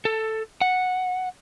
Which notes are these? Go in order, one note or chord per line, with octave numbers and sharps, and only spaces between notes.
A4
F#5